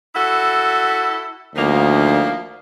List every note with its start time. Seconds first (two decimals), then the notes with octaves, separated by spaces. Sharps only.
0.15 E4 F#4 A4
1.55 D2 D#3 F3 A#3